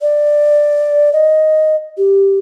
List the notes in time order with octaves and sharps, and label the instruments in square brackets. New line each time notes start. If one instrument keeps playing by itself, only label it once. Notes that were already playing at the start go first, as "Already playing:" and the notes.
[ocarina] D5
D#5
G4